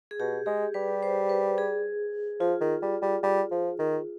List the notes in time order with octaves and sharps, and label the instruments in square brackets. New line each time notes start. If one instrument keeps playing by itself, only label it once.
[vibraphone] G#4
[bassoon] B2 [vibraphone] G4
[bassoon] G#3 [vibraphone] G4
[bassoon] G3 [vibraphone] B4
[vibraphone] C5
B4
G#4
[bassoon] F3 [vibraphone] F4
[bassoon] D#3
G3
G3
G3
F3
D#3